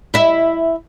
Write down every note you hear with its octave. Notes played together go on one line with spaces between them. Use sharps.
E4 E5